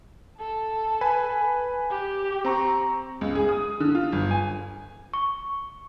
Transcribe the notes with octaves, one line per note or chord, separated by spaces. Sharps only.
A4 A5
B4 G#5 B5
G4
C4 A#5 C#6
C#2
G#4
D#6
D3
F4
G1
G#5
C#6